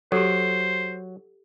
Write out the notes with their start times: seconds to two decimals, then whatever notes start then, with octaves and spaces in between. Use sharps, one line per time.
0.12 F#3 G4 A4 C5